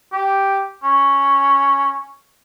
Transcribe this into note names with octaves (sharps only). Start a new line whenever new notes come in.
G4
C#4